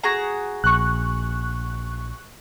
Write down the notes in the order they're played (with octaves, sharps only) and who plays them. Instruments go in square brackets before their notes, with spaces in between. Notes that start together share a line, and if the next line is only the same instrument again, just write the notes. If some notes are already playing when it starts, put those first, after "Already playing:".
[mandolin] F#4 G#4 A#5
[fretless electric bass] A#1 [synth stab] C#6 F#6